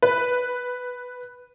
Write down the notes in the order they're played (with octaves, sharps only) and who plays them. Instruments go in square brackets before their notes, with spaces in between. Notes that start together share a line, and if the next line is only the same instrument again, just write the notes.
[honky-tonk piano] B4